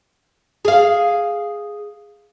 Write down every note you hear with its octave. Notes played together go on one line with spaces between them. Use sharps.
G#4 F5